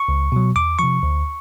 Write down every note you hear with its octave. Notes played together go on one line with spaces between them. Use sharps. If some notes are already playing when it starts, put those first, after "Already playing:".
Already playing: C#6
C#2
B2 F#3
E2 D6
C3 F3 C#6
D2